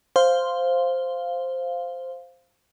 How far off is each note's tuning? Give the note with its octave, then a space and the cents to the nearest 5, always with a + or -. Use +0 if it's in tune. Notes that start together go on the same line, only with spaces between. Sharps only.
C5 +0 F5 +0